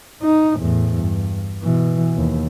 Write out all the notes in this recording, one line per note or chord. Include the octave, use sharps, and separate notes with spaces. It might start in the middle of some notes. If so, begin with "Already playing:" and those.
D#4
E2 A2
G2
B2 E3
D#2